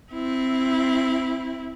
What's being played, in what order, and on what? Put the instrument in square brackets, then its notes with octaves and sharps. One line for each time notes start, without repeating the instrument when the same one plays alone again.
[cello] C4 E4